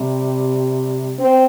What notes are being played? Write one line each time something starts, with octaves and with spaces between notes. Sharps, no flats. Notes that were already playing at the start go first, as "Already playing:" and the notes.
Already playing: C3 G3
C4